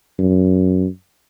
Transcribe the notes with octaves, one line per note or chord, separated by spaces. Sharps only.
F#2